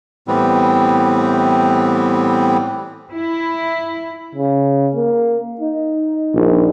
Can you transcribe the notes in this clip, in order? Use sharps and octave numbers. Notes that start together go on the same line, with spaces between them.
A2 E3 G3 B3 C4
E4
C#3
A#3
D#4
A#1